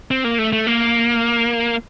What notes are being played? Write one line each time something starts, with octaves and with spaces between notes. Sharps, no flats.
C4
A#3
A3
A3
A#3